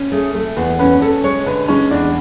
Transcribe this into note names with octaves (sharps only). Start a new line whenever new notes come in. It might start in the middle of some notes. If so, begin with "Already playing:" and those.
Already playing: C#4
A3 G#4
A3 A4
E2 B4
C#4 B4
C#4 A4
G#3 C#5
D3 B4
G#3 C#4
E2 D4